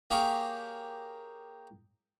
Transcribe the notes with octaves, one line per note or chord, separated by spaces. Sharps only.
A#3 G4 G#4 A#4 C#5 G5